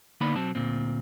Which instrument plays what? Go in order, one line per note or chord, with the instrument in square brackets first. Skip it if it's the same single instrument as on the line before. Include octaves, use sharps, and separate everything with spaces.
[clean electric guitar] D3 A#3 B3 D#4 D5 B5
B1 F#3 C4 A5
D2 A#2 C4